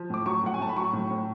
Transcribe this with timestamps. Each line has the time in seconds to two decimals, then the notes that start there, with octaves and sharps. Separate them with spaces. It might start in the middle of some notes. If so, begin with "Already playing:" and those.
Already playing: F3
0.10 A2 D6
0.26 F#3 C#6
0.43 A2 F#5
0.54 G#5
0.60 A2 A5
0.69 B5
0.77 F#3 C#6
0.93 A2
1.11 A2